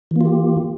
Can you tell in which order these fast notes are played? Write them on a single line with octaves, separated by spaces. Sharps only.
E3 A#3 F4 G4